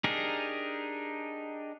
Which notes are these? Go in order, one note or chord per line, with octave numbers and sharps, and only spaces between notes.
D4 D#4 G4 G#4 A#4